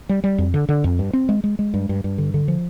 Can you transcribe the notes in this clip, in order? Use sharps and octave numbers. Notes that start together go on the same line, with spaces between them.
G3
G3
F2
D3
D3
F2
G2
C4
G#3
G#3
G#3
G2
G2
G2
D3
D3
F3